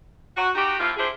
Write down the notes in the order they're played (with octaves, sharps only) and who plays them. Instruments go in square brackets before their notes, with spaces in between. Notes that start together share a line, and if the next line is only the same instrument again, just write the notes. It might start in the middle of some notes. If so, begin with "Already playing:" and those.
[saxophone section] F#4
D#4 F#4 G4
F3 A#3 E4 F4
D4 E4 G4 G#4 C5